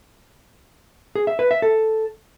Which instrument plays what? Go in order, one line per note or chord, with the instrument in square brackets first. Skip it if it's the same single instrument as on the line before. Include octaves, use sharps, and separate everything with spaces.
[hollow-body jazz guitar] G#4
E5
B4
E5
A4